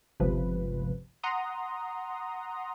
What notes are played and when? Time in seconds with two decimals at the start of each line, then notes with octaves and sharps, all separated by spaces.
0.20 G1 C#2 C3 F3 B4
1.23 F#5 A#5 C6 D#6